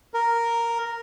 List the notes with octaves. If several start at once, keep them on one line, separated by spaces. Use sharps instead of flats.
A#4